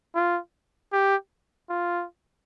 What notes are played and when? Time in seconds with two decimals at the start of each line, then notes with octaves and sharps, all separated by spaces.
0.15 F4
0.93 G4
1.70 F4